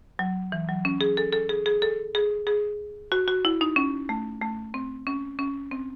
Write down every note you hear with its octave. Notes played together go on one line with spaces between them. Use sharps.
F#3
E3
F#3
C#4
G#4
A4
A4
G#4
G#4
A4
G#4
G#4
F#4
F#4
E4
D#4
C#4
A3
A3
C4
C#4
C#4
C4